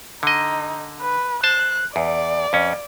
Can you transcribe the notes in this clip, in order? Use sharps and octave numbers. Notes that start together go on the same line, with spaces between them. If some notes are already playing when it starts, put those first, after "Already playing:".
D3 D#4 D#5
B4
C5 A5 F#6
E2 D5
F2 C#4